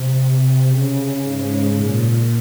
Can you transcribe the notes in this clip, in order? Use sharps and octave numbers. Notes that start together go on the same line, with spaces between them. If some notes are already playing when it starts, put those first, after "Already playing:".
Already playing: C3
C#3
G#2
A#2